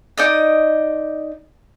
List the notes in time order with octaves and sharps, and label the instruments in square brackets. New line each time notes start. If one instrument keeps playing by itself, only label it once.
[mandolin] D#4 D5 D#5